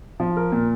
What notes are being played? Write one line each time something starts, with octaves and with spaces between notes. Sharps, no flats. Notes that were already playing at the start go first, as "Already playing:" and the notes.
F3
A#4
A#2